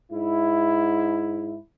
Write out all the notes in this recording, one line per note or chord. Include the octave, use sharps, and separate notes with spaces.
G#2 E4